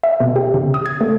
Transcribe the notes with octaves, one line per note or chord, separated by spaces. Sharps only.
E5
B2
G4
C#3
D#6
G#6
A3